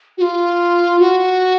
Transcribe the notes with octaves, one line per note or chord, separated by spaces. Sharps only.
F#4
F4
F#4